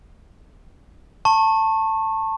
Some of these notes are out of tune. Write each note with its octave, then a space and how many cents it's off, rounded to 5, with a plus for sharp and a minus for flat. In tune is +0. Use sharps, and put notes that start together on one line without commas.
A5 +15 C#6 -25